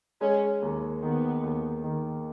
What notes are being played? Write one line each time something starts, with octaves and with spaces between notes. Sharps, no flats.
G#3 C#4
D#2
D#3 B3
D#2
D#3